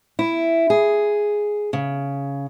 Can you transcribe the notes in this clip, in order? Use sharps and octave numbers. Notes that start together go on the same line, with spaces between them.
E4
G#4
C#3